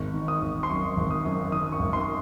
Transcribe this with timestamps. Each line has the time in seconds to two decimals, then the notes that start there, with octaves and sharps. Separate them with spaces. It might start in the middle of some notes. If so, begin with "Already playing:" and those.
Already playing: G#1 C#6
0.14 D#3
0.28 D#6
0.41 G#1
0.63 C6
0.69 F#2 C#6
0.97 G#1
1.11 D#6
1.25 F#2
1.52 D#3 D#6
1.72 C#6
1.79 G#1
1.93 C6